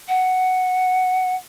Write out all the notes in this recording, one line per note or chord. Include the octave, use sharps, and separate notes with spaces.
F#5